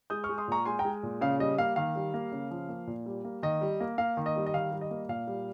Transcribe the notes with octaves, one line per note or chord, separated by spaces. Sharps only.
G#3 D#6 G6
C#6 F6
G#3
C6 D#6
A#2 A#5 C#6
G#3 G#5 C6
G5 A#5
G#3
A#2
C#3 F5
G3 D#5
A#3 F5
D#3 F5
G3
A#3
C#3
F3
A#3
A#2
G3
A#3
D#3 D#5
G3
A#3
A#3 F5
D#3
D#5
G3
D#5
D#3 F5
G3
D#5
A#3
A#2 F5
G3